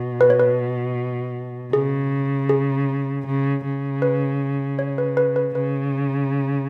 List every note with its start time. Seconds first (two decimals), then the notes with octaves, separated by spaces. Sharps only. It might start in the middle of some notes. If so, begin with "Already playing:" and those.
Already playing: B2
0.21 B4
0.30 C#5
0.40 B4
1.73 C#3 G#4
2.49 G#4
3.26 C#3
3.64 C#3
4.02 B4
4.79 C#5
4.98 B4
5.17 B4
5.36 B4
5.55 C#3 B4